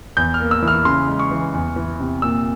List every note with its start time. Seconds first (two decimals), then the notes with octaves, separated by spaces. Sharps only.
0.17 E2 G6
0.34 F6
0.40 A#3
0.51 E6
0.62 E3
0.68 F6
0.85 C#3 C6
1.08 G#3
1.20 C#6
1.31 E3
1.54 E2
1.76 E3
2.00 C3
2.22 A#2 E6